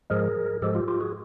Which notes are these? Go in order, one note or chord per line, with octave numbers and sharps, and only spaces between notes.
G#2 F3 G#3 G#4 A#4
G#2 F3 G#3 G4 A4
F4 G4
F4 G4
F#4 G#4